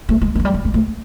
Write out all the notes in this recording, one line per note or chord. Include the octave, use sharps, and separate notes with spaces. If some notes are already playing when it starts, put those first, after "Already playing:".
A3
G#3
G#3
F#3
G3
G#3
G#3
A3